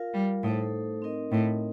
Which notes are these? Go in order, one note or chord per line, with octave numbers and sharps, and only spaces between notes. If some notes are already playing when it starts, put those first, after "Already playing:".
Already playing: F4 A#4 F5
G3
A2 A3 D#4 A4 C5
C4 D#4 A#4 D#5
A2